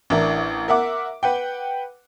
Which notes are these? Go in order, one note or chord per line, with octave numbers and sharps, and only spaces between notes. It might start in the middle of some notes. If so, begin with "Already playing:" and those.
A1 D4 E4 A#4
A#4 E5 F#5 D6
B4 F#5 G5